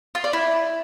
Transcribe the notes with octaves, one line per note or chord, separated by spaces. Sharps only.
F4
D5
E4